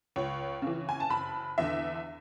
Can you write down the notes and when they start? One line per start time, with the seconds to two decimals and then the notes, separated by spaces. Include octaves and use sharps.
0.16 C#2 C#5
0.62 C#3 E3
0.89 G#5
1.00 A5
1.10 F#1 B5
1.58 E2 D3 E5